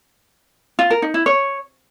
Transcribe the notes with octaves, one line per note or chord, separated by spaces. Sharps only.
F4
A#4
D#4
E4
C#5